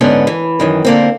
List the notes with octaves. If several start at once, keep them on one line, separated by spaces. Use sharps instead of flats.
G#2 D3 B3 C#4
E3
F#2 D#3 E3
D3 A#3 C4